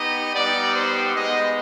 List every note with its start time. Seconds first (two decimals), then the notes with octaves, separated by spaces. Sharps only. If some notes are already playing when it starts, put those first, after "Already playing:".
Already playing: B3 D#4 G4 D#5
0.34 G3 B3 D#4 G4 D5
0.74 C5
1.14 G#3 B3 D#4 D#5